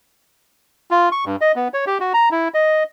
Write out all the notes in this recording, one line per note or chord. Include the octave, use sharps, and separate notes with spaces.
F4
C#6
G2
D#5
B3
C#5
G4
F#4
A#5
E4
D#5